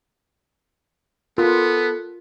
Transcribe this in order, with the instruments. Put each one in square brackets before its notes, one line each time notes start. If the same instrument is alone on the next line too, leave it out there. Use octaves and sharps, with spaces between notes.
[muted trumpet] B3 [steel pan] F4 A#4 C6 [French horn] A4